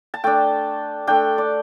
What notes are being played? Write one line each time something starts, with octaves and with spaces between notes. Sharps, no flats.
A5
A3 D4 G5
A3 D4 G5
D5